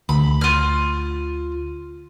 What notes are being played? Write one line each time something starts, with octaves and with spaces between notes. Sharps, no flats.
D2 B5
F4 F6